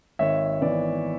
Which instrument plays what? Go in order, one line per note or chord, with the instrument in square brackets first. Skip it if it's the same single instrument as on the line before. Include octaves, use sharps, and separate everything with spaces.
[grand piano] G#1 C#5 E5
E3 B3 D5